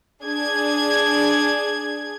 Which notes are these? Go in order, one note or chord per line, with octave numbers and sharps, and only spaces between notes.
D4 G#4 G#6